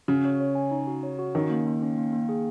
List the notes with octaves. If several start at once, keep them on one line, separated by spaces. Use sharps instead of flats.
C#3 F#4
C#5
C#5
G#5
D#4
F#4
C#5
F#4
D#3 C#4
A#3
A#3
C#4
A#3
A#3
G#4